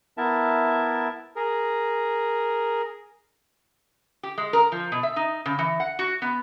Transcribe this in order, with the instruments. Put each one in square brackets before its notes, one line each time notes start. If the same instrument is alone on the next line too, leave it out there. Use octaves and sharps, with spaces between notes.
[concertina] B3 E4 A#4 E5 A5
[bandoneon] G#4 A#4
[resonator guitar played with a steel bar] G4
G#3
A#4
F3
B2
E5
D#4
C#3
E3
F#5
F#4
B3